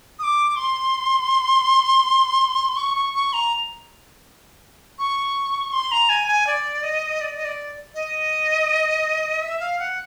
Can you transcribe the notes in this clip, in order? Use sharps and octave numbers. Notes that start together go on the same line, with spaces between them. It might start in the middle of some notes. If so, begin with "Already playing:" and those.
D#6
D6
C6
C#6
C#6
C#6
A#5
C#6
C6
A#5
G#5
G#5
D5
D#5
D5
D#5
D5
D#5
E5
F5
F#5